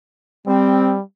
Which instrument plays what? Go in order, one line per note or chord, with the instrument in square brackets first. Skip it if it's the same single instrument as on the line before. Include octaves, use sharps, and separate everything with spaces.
[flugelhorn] G3 [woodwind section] C4